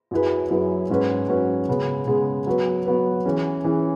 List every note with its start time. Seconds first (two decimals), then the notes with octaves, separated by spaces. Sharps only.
0.11 F#2 F#3 E4 G#4 B4
0.50 F#2 F#3 E4 G#4 B4
0.90 G#2 F#3 C#4 F#4 B4
1.28 G#2 F#3 C#4 F#4 B4
1.68 C#3 G#3 B3 G#4
2.07 C#3 G#3 B3 G#4
2.47 F#3 B3 F#4 B4
2.85 F#3 B3 F#4 B4
3.25 E3 C#4 G#4
3.64 E3 C#4 G#4